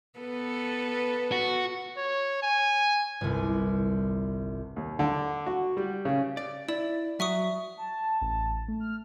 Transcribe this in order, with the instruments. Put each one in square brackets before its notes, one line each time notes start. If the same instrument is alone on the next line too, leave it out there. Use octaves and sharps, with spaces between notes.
[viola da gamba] B3 A4 B4
[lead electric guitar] F#4
[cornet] C#5
G#5
[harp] G1 C2
[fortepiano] D#2
D3
F#4
G3
C#3
[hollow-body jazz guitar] D5
[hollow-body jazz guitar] E4 [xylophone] D5
[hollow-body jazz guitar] F#3 [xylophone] E5 C#6 D#6
[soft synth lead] A5
[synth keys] A1
A3
[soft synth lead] F6